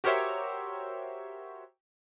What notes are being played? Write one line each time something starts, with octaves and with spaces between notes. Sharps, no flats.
F#4 G4 A#4 C5 C#5 E5